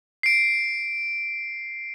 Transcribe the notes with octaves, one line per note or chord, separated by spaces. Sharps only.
C7 D7